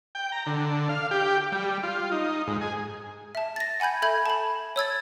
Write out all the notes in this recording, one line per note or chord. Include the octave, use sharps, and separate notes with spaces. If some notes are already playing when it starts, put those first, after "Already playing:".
G5
A#5
D3
F5
G4
G3
F4
D#4
G#2
G#4
E5 A5
A6 A#6
F#5 G#5 B5 G6 G#6
A4 E5 B5 G6 G#6
A5 B5
C#5 E6 G#6 A6